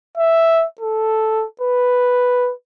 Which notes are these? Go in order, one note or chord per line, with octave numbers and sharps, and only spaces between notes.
E5
A4
B4